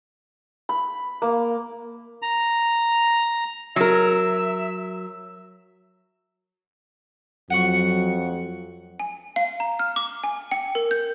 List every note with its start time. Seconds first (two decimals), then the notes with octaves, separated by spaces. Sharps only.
0.69 B5
1.22 A#3
2.22 A#5
3.76 F#3 A#4 E5
7.51 F2 F#3 F#5 C#6
9.00 G#5
9.36 F5
9.60 A#5
9.79 F6
9.96 D6
10.24 G#5
10.52 G5
10.75 A#4
10.91 G6